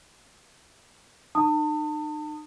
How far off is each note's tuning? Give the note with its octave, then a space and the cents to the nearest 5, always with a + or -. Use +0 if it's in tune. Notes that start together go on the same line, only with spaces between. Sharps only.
D#4 -40 A5 +35 D#6 +0